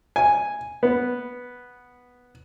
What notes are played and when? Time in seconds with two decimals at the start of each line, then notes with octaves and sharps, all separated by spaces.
0.16 G#5
0.83 B3